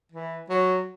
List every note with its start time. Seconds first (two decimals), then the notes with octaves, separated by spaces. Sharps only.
0.12 E3
0.50 F#3